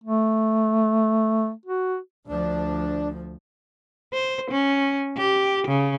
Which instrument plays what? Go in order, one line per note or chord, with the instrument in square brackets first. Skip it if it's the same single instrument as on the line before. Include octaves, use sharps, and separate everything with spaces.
[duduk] A3
F#4
[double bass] D2 F3 [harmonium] D4
[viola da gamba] C5
C#4
G4
C#3